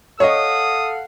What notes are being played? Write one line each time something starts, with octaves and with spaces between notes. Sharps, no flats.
A4 C#5 D#5 F5 F#5 D#6